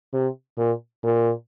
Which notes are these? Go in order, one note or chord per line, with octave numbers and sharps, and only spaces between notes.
C3
A#2
A#2